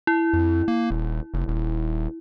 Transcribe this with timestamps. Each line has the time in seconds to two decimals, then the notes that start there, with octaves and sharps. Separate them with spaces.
0.07 E4
0.33 F2
0.68 A#3
0.91 D#1
1.34 F1
1.48 D#1